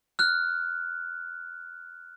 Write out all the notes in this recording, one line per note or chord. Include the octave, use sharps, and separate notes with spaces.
F6 F#6